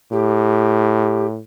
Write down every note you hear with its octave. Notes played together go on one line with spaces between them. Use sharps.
A2 G4